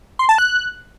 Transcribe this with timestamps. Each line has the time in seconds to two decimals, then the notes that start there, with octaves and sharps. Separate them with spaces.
0.19 C6
0.29 A5
0.38 F#6